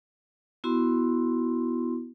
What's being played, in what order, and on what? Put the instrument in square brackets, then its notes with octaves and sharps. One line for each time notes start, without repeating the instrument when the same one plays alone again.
[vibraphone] B3 E4 F#4 C6